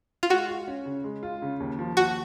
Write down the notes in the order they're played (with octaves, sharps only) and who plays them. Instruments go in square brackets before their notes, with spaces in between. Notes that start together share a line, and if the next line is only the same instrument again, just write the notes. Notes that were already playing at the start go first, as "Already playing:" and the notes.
[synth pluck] F4
[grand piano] G#3 [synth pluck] F#4
[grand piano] F4
C#4
C#3
G#3
F4
C#3
D#2
F3
[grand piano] D#2 [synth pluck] F#4